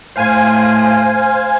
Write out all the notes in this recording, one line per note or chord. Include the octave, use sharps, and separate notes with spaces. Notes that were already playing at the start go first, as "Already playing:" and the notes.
A2 C5 F5 G#5